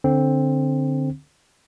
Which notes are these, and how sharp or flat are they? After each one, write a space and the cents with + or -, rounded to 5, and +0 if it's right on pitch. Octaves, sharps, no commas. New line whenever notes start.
D3 +0 C4 +5